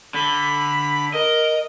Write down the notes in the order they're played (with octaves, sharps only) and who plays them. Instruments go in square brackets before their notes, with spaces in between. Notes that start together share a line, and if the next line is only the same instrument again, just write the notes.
[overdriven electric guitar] D3 [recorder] B5
[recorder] A#4 [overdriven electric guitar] D#5